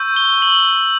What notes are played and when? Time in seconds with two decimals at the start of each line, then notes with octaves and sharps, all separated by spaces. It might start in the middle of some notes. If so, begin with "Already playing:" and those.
Already playing: C#6 E6 G6
0.16 G7
0.42 F#7